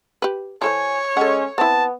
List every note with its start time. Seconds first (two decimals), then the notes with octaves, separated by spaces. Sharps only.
0.22 G4 B4
0.62 E3 A4 C5 C#5 G#5
1.17 G#3 C#4 A4 F#5
1.58 B3 C4 E4 A5